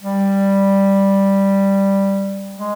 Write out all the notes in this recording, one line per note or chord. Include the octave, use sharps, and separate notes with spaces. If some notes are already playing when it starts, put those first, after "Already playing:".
G3
G#3